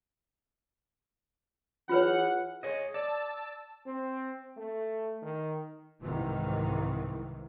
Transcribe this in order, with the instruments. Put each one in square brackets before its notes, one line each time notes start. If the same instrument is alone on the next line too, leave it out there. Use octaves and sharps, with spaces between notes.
[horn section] E3 G#4 F#5 [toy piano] F4 B4 C#5
[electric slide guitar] G#4 C#5 D#5
[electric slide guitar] D5 [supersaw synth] A5 E6
[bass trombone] C4
A3
D#3
[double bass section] C2 G#2 C3 D#3 E3